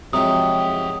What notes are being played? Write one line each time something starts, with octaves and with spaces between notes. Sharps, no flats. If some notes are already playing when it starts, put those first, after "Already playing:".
C3 F3 F#3 G#3 G#4 G5 D#6